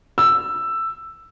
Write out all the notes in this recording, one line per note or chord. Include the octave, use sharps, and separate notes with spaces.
E6